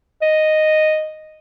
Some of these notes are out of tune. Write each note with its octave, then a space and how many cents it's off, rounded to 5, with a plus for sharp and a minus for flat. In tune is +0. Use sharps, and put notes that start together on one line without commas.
D#5 -5